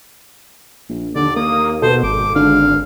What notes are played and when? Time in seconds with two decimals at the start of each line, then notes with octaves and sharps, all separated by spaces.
0.89 A#1
1.15 D#2 D3 D5
1.36 A#3 D#6
1.82 B2 A4 C5
2.03 G#1 D6
2.35 D3 F5